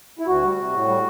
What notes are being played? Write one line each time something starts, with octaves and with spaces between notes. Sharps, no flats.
E4
D2 F#4
G3
C3
A2
G3